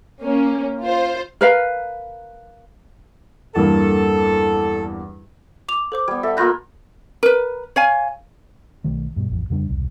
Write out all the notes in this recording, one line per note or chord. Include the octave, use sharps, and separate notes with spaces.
A#3 C#4
F4 C5
A#4 B4 F5
E2 G2 A#3 A4
D6 F7
A4 C5 D6
G3 B3 G#6
A4 E5 F#5
A#3 F4 B5 F#6 G6 A#6
A#4 B4
C#5 F5 G#5
B1 D#3 A3
G2 B2
A1 F2
F2 C#3 G3 D4
E1 C2